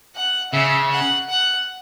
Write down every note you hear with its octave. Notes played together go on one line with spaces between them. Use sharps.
F#5
C#3 E5
F#5
F#5